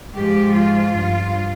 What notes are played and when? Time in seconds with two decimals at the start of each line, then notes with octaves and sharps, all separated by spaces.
0.15 G#2 F3 G4
0.54 F4
0.94 G2 F3